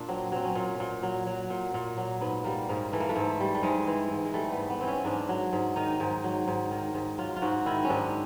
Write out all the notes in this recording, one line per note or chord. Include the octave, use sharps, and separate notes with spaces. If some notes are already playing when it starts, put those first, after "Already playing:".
Already playing: A#2 D4
F#3 C4
F#3 C4
C#4
A#2
A#2
F#3
F#3
A#2
A#2
F#3
G#2 B3
G3 A#3
G#2 A#3
E3 A3
A#3
A3
G#2
G3
A3
G#2 G#3
E3
G#2
G#3
G3 A3
B3
G#2
B3
E3 C4
C#4
G#2 D4
F#3
G#2
D#3 D#4
G#2
F#3
G#2
D#3
G#2
F#3 F4
F4
G#2 F#4
D#3 E4
C#4
G#2 D4